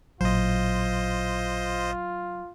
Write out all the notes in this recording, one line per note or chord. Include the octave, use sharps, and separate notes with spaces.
A1 A#2 F#3 F4 C5 D#5